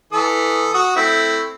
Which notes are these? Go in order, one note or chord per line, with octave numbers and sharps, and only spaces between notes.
E3 A4 D#6
F#4 D#6
A3 C4 E4